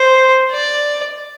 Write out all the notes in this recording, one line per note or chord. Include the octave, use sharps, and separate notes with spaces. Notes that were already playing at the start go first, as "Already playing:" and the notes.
Already playing: C5
D5